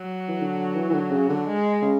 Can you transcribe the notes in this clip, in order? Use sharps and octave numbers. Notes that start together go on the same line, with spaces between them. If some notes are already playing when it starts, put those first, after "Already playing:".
Already playing: F#3
E3
D3
E3
E3
D3
C#3
D3
G#3
C#3